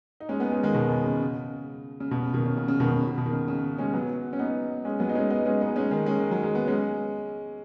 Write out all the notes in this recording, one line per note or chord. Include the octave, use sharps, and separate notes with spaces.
D#4
G#3 C#4
B3 D#4
G#3 C#4
D#3 G#3
B2 D#3
B2
C#3
C#3
C#3
B2
C#3
B2 D#3
C#3
C#3
C#3
B2 D#3
C#3
C#3
B2
D#3
C#3
C#3
G#3 C#4
F#3 B3
C#4
B3 D#4
G#3 C#4
F#3 B3
D#4
G#3 C#4
B3 D#4
G#3 C#4
B3 D#4
G#3 C#4
D#3 G#3
G#3 C#4
D#3
F#3
G#3
B3
G#3 C#4